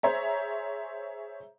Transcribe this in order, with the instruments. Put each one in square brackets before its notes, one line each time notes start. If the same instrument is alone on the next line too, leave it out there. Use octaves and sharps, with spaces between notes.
[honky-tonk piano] G#4 C5 C#5 E5 A#5